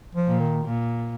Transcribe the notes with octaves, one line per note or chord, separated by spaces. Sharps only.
F3
A#2
D#3
A#2